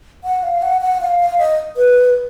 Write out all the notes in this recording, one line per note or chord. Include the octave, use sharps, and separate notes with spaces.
F#5
F5
F#5
F#5
F5
F5
D#5
B4